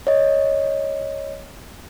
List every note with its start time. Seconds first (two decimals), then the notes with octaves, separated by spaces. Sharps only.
0.07 C#5 D#5